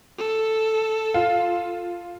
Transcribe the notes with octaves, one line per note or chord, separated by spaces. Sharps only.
A4
F4